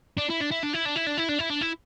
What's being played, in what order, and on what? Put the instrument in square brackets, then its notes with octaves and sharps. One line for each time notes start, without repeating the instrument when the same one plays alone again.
[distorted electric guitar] D4
E4
D4
E4
D4
E4
D4
E4
D4
E4
D4
E4
D4
E4